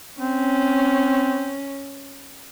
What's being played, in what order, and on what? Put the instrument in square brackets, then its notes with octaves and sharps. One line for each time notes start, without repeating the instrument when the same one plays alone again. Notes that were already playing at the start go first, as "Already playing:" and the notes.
[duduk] C4 [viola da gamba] C#4